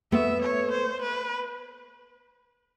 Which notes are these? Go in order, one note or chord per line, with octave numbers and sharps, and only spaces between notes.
A3 B3 E5
C#5
C5
B4